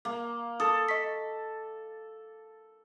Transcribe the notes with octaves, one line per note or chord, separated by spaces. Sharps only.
A#3
A4 D#6
D#5 C#6 B6